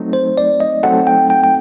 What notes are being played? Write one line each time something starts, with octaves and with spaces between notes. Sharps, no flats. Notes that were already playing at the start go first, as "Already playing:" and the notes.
Already playing: F#3 A3 C4 D#4
C5
D5
D#5
F#3 A3 C4 D#4 A4 F#5
G5
G5
G5